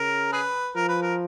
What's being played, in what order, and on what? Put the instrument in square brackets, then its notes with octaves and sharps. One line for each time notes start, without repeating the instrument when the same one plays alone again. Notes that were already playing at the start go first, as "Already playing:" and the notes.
Already playing: [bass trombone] C#3 [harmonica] A#4
[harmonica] G#4 B4
[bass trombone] F3 [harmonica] A#4
[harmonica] B4
A#4